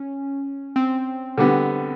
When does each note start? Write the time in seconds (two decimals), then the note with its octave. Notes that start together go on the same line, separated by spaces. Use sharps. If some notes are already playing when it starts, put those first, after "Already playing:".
Already playing: C#4
0.76 C4
1.38 D3 G3 B3